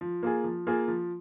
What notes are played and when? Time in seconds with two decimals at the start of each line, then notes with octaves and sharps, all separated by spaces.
0.01 F3
0.23 A#3 F4 G#4
0.44 F3
0.67 A#3 F4 G#4
0.88 F3